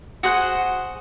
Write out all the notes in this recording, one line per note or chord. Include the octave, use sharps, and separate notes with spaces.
F#4 G#4 C5 F#5